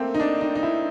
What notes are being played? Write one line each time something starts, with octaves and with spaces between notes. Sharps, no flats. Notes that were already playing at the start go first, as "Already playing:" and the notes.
Already playing: A3 A#3 C4
D#4
D4
D#4
D#4
E4